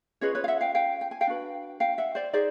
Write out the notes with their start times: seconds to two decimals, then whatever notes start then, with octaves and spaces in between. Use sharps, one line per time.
0.21 C#4 F4 G#4 B4 C#5 D#5
0.35 B4 C#5
0.44 F5
0.48 E5 F#5
0.61 F5 G5
0.75 F5 G5
1.01 G5
1.11 G#5
1.21 F5 G5
1.27 D4 F#4 B4
1.80 F5 G5
1.98 E5 F#5
2.15 C5 D5
2.33 D#4 G#4 C5 D5